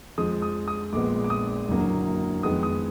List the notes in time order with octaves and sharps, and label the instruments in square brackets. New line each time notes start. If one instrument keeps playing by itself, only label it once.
[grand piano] F2 F3 G#3 D#6
D#6
D#6
A#1 A#2 G#3 B3 D6
D6
D#6
F#1 F#2 D3 F#3 A#3
F2 D#3 G#3 B3 D#6
D#6